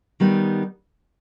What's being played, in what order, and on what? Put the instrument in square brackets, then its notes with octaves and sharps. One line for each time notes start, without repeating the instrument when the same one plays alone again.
[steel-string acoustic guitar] D#3 G3 B3 D#4